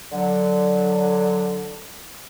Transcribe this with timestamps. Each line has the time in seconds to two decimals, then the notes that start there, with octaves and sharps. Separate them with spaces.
0.12 D3 F#3